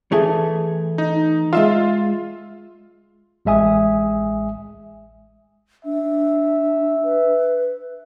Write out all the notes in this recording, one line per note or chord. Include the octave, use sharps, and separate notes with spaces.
E3 A3 G#4
D#4
G#3 F4 E5 F5
A1 G#3 E5 G#5 D#6
D4 E5
B4